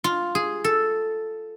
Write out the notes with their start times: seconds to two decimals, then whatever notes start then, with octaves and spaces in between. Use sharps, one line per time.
0.04 F4
0.35 G#4
0.64 A4